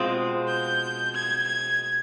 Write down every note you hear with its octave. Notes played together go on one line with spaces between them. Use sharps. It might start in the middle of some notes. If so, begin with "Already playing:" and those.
Already playing: B2 G#3 C4 F4
G6
G#6
G#6